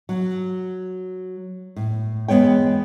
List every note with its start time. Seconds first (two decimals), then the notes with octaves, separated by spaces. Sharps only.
0.09 F#3
1.76 A2
2.28 E2 G#3 B3 C#5 G5